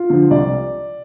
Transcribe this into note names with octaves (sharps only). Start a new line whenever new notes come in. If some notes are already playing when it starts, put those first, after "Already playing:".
Already playing: F4
D3 F3
C2 D5